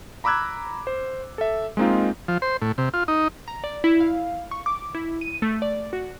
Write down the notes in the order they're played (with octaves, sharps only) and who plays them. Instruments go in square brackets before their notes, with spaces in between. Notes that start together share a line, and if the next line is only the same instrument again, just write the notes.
[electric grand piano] A#5 B5 D6 E6 F#6 G#6
C5
A4 E5
G#3 A#3 C4 D#4 F4
[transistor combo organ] F3
C5
A2
C3
F4
D#4
[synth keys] A#5
D5
E4
F5
C#6
D6
E4
D#7
A3
D5
F#4